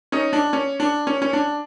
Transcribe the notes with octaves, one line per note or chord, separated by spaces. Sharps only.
C#4 D#4
D4
C#4
D4
C#4
C#4
D4